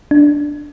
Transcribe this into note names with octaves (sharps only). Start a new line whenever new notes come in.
D4